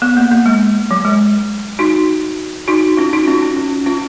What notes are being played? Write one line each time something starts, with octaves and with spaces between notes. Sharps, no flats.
B3
A#3
A#3
G#3
F#3
G#3
D#4 F#4
D#4 F#4
C#4 F4
D#4 F#4
C#4 F4
C#4
C#4
C#4 F4